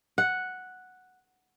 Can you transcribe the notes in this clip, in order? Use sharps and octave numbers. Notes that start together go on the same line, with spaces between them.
F#5